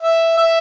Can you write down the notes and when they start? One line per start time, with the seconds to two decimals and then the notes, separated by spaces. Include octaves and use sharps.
0.01 E5
0.38 E5